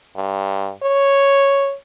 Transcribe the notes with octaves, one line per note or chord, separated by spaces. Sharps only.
G2
C#5